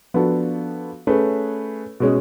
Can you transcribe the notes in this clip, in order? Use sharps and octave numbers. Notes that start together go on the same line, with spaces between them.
F3 B3 D4 F#4 A4
A3 C#4 G#4 B4
B2 G#3 C#4